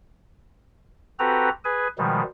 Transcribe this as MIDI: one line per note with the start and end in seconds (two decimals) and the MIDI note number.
1.19 1.49 60
1.19 1.49 66
1.19 1.49 67
1.19 1.49 69
1.19 1.49 71
1.19 1.49 82
1.65 1.88 68
1.65 1.88 71
1.65 1.88 80
1.98 2.22 47
1.98 2.22 51
1.98 2.22 53
1.98 2.22 55
1.98 2.22 56